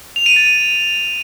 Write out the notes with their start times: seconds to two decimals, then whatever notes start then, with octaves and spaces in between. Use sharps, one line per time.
0.16 F7
0.26 D#7
0.36 A6